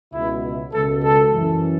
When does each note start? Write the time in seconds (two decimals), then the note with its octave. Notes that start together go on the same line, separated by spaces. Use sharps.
0.13 C#2 B2 E4
0.73 C#2 B2 A4
1.03 A4
1.32 F#2 E3